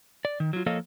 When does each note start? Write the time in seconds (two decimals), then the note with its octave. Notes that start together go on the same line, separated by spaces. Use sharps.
0.25 D5
0.40 D#3
0.53 F#3 F4
0.66 F3 A#3 A4 C#5 D#5 F5